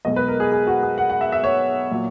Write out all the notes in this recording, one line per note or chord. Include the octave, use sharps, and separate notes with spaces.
B1 B2 G#3 D#5
B4
A#4
G#4
G#4
F#4
G#4
F#5
F#5
E5
E5
C#5
A#2 F#3